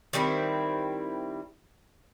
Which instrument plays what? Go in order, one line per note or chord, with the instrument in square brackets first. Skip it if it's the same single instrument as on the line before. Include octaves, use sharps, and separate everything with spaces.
[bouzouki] D#3 G3 C4 E4